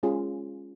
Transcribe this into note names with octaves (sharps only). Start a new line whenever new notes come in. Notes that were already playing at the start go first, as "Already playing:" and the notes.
G#3 C#4 F4 G#4